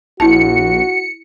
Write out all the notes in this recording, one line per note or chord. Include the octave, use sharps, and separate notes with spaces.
A#1 E4 F#4 A5 C#7